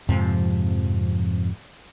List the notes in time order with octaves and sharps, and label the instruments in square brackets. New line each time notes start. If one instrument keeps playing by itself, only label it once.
[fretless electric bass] F2 G#2 C3 F3